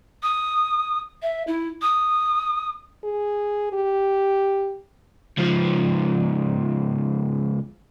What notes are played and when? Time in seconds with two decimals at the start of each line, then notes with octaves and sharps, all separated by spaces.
0.23 D#6
1.22 E5
1.47 E4
1.82 D#6
3.04 G#4
3.73 G4
5.38 C#2 F3